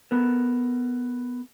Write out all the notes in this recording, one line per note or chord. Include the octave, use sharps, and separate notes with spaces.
B3 A4 A#4